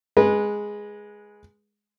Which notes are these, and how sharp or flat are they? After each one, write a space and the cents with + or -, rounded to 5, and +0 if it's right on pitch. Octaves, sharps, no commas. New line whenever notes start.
G#3 +0 B4 -20